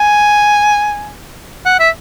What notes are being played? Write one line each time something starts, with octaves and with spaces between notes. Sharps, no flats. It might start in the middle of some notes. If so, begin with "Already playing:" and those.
Already playing: G#5
F#5
E5